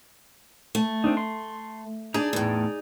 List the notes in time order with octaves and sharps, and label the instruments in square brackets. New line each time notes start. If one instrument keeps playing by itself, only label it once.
[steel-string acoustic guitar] A3
[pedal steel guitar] C4 D4 D#4
C6
[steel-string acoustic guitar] D4 [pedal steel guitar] D#4 G#4 D5
[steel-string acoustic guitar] E2 A2